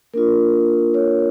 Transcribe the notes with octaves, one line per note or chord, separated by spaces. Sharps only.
A#3 D4 F4 A#4
C#5